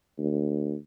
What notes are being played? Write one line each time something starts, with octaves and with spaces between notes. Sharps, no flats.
D2